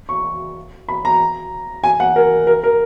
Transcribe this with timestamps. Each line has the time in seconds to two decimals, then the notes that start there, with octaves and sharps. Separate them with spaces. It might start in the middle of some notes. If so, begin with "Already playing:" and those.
0.09 C#6
0.89 B5
1.05 A#5
1.84 G#5
2.00 F#5
2.16 A#4
2.47 A#4
2.64 A#4